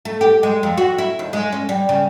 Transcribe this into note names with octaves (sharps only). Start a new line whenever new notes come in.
A3
G4
G#3
F2
F#4
E4
D#2
G#3
C#4
G3
C#3